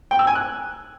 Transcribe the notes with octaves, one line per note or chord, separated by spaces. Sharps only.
G5
E6
G#5
F#6